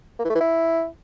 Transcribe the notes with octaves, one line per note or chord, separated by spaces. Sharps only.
A#3
E3
A3
E3
E4